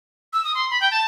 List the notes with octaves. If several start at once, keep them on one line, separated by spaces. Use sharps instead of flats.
E6
D#6
C6
B5
G5
A5